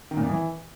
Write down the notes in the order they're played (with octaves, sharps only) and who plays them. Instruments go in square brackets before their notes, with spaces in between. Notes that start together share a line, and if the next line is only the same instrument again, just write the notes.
[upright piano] D#3
A#2
F2
E3